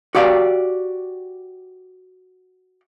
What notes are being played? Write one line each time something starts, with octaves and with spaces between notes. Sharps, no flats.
F#4 G4 D5 F5